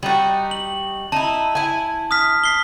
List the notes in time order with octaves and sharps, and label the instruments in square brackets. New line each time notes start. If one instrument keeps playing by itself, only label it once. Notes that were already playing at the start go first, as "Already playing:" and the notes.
[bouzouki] G3 D#4 F#4
[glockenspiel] F#7
[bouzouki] D#4 E4 [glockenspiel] A5
[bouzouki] E4 G#5
[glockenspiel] D#6 F6 B6
B6 C7 G7